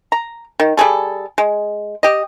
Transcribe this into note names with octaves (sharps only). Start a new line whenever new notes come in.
A#5
D#3
G3 G#3 G#4 A4
G#3
G4 D#5